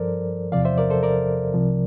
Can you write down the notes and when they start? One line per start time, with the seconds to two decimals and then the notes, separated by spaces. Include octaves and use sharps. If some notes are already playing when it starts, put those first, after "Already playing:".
Already playing: G2 F3 A4 A#4 C5 D5
0.52 E2 C3 F3 D5 F5
0.65 C5 E5
0.78 A#4 D5
0.90 A4 C5
1.03 A#4 D5
1.54 C2 C3 F3